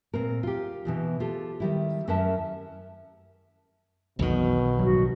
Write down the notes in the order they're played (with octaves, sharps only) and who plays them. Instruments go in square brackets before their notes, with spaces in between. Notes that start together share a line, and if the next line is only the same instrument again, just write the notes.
[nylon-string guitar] A#2 C4 A#4
F4 G4
B2 E3 D#4
F4 G4 A4
D#3 G3 E4
F#2 C#4 E4 A#4 E5 A5
[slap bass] B1 D#3 [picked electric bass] F2 E3 B3 [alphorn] B2
[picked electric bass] A1 G2 F#3 [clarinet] F#4